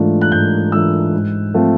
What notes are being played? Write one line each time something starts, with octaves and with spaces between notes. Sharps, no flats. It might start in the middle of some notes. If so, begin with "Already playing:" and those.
Already playing: G#2 E3 A3 D4 F4
F#6
G#2 G6
E3 A3 D4 F4 E6
G#2
F3 A3 C4 F4